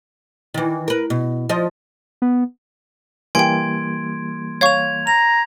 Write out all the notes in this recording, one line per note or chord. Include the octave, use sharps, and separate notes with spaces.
D#3 E3
A#4 B4
B2
F3 D#5
B3
E3 G3 A#3 G5 G#5 C6 G#6 D7
C#5 F5 C#6 G#6 F7
A#5 F7